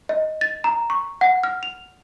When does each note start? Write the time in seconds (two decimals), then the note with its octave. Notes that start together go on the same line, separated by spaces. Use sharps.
0.09 D#5
0.41 A6
0.64 A#5
0.90 C#6
1.21 F#5
1.43 F6
1.63 F7